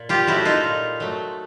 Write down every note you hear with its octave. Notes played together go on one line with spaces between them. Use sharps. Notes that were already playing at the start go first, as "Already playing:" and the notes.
Already playing: A#2
F4 G4
F#3 A3 E4 F#4
D#4 F4
A#2
F#3 A3